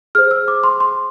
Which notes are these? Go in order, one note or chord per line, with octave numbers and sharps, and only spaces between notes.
G#4 C5 F6
E6
D6
C6
C6